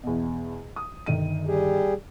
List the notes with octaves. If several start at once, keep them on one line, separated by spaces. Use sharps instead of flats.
E2 B2
D#6
G1 D#3 D#7
G3 G4 G#4